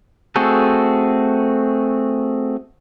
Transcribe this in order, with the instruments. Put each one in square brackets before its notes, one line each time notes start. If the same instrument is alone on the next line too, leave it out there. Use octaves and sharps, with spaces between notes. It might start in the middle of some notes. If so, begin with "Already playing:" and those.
[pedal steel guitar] A3 C4 F#4 G#4 A4